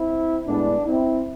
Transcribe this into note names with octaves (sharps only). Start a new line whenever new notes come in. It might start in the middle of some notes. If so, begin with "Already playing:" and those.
Already playing: C4 E4
A2 G#3 B3 D4
C4 E4